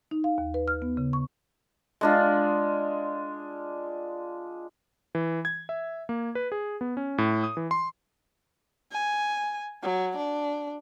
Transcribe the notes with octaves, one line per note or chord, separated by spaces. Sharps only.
D#4
F5
D#2
B4
F6
B3
C#3
C#6
G#3 D4 F4
E3
G#6
E5
A#3
B4
G#4
B3
C#4
A2
D#6
E3
C6
G#5
F#3
D4